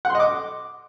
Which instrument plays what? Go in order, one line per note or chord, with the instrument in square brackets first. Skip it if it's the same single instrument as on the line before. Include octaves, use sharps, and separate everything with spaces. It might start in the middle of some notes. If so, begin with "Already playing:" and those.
[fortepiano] F#5
C6
D#5
D6